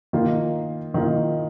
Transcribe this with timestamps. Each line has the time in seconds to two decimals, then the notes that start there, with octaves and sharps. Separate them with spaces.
0.13 D#3 A#3 F4
0.94 D#3 A#3 F4